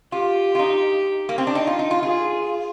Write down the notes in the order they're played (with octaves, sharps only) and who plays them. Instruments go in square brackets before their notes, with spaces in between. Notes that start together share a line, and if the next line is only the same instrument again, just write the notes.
[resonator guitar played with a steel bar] F4 [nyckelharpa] G4
[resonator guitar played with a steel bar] F4
D#4
A#3
C4
D4
D#4
F4
D#4
F4
[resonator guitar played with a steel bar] F4 [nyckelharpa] G#4